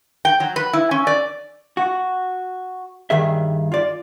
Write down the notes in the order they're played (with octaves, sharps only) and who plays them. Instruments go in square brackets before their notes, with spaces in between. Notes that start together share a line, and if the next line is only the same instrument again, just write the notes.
[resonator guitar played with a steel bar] G5
F#3
B4
E4
C#4
D5
[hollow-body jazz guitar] F#4
G2 D#3 G#4 E5
F4 D5